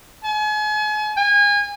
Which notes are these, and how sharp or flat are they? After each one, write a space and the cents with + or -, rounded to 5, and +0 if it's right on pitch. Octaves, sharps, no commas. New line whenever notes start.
G#5 +40
G#5 -30